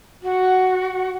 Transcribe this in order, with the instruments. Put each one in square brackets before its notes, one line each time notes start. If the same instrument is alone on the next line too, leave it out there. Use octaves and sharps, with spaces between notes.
[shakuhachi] F#4